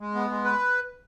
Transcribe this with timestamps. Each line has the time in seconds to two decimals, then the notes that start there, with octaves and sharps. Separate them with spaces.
0.01 G#3
0.15 B3
0.30 G#3
0.44 B4